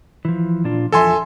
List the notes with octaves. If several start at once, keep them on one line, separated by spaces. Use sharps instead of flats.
E3 F3
A#2 D4 F4
E2 F3 A4 E5 G#5 C6